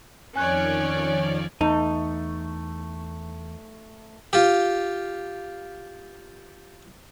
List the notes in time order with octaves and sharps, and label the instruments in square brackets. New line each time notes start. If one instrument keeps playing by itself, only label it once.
[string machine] F2 D#3 F3 [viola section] C#4 C#5 D5 [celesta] G#5 F#6
[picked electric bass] E2 [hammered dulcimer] A3 [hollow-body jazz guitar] D#4
[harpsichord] F4 G4